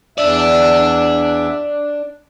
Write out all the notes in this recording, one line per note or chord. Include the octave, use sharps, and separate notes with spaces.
E2 D4 D5 E5